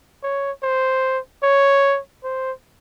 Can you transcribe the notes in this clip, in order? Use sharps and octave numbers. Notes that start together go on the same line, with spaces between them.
C#5
C5
C#5
C5